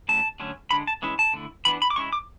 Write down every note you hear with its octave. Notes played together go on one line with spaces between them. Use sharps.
C#3 F#3 A3 E4 A5
D3 F#3 A3 C#4
D3 G#3 D4 B5
A5
E3 G#3 C#4 E4
A5
D3 A3 E4
E3 B3 D4 B5
B5
D6
G#3 C#4 E4 C#6
D6